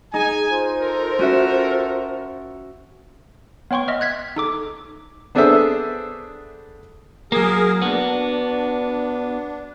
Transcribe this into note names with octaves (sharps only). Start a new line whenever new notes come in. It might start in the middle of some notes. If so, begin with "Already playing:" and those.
D#4 G#4 G#5
F4 C5
A4 A#4
C#4 F#4 E5
B3 C#5 G5 C6 C#6
D#5 E5 F6
F#6 G#6 B6
D#4 A4 D6
B3 D4 G#4 A4 C5 E5
F#3 A#3 G#4 A#4
B3 D4 F#4